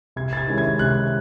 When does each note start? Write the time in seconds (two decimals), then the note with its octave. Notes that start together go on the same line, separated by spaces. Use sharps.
0.16 C3 G#6
0.33 A6
0.37 G#6
0.48 D#3 G#3 C#4 E4
0.58 G#6
0.79 C3 F#6